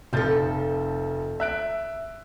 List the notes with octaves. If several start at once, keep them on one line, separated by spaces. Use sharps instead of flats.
F1 F3 A4 G6 A6
E5 F#6 D7